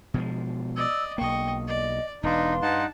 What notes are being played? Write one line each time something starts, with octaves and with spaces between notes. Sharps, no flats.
B2 F3 G#3
D5 D#5 E6
B1 A#3 D#5 G5 C#6
D5 D#5
E1 D4 D#4 B4 F5 C6
G2 D#4 F#5 A5